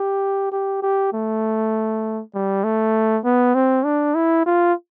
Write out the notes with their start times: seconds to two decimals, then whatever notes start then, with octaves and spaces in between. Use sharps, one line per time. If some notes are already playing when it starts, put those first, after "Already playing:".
Already playing: G4
0.52 G4
0.82 G4
1.13 A3
2.34 G3
2.64 A3
3.25 B3
3.55 C4
3.85 D4
4.15 E4
4.46 F4